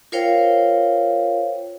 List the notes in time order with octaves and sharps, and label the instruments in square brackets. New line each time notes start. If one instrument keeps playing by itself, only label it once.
[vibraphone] F4 A#4 C5 C#5 F5 G5